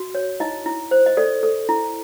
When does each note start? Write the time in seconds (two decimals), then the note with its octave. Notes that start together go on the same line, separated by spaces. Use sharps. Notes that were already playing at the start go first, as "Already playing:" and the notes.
Already playing: F#4
0.15 C#5
0.40 D#4 E4 D#5
0.66 E4
0.91 C5
1.06 D#5
1.17 A4 D5
1.43 A4
1.69 E4